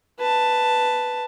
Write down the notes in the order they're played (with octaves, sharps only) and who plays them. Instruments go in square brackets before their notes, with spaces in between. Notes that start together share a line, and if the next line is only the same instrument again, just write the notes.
[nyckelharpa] B4 A5